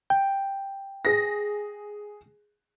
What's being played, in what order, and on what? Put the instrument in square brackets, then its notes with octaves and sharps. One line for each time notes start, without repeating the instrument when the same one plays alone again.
[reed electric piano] G5
[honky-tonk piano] G#4 A#6